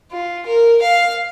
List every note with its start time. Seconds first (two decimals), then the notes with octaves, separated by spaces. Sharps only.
0.12 F4
0.46 A#4
0.82 F5